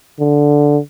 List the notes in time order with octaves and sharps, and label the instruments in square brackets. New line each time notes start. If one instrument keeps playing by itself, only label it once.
[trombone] D3